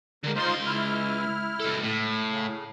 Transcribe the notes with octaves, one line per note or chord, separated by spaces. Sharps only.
D3 G#3 A#3
C#2 D#4 F4 C5 C6
E4 F6
C#2 A4
A2
C#3